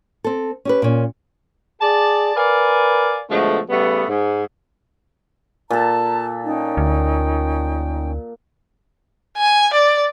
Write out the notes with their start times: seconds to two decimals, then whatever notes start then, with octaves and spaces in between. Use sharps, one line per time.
0.24 C4 A4
0.65 C#4 G4 B4
0.82 A#2 C#4
1.81 G#4 D5 A5
2.36 A#4 B4 D5 F5 G#5
3.30 B2 D3 F3 G#3 A3
3.70 C#3 G3 A3 B3
4.08 G#2
5.70 A#2 A4 A5 A#5
6.44 C#4 D#4 G5
6.77 D2
9.38 G#5
9.74 D5